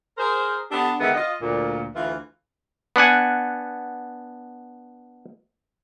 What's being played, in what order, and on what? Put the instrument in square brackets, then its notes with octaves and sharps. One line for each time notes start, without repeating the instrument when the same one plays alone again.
[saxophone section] G#4 A#4 C5
D3 B3 D4 G4 A4
B2 D3 D#3 G#3 B3 E5
F4 D#5
D2 A#2
D2 E3 F4
[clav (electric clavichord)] B3 D4 F#5 G#5